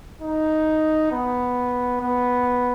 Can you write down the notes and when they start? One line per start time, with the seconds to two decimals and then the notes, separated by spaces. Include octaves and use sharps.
0.22 D#4
1.12 B3
2.02 B3